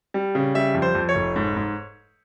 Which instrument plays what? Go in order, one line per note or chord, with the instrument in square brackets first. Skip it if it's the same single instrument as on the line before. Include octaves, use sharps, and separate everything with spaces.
[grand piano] G3
C#3
G3 E5
F2
C5
F2
C#5
F1
G#2
G#2